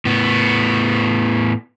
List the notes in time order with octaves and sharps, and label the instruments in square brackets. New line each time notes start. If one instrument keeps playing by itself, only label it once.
[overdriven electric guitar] A2 B3